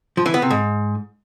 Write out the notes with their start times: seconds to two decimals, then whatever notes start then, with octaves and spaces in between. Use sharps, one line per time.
0.17 F3
0.26 E3
0.34 B3
0.42 C3
0.50 G#2